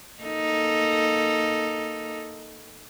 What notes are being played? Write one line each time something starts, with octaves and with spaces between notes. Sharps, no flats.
A#3 D#4 A4